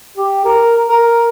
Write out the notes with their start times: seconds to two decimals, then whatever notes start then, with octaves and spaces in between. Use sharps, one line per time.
0.17 G4
0.45 A#4
0.89 A#4